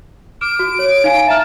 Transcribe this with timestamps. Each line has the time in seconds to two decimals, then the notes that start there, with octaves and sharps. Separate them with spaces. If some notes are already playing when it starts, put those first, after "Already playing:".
0.41 D6 F6 D7 E7
0.59 F#4
0.79 C#5
1.04 D#4 F5 G#5
1.27 E5 A5 A#5 F6